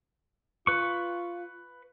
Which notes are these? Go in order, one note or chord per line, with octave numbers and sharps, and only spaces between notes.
F4 B4 C#6